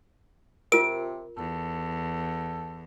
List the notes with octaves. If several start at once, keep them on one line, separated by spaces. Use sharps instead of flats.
C3 F4 A#4 D7
E2 A4